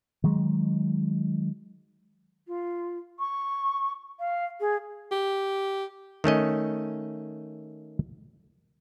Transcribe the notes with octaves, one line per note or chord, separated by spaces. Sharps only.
D#3 F#3 G#3
F4
C#6
F5
G#4
G4
D#3 A3 C#4 D#5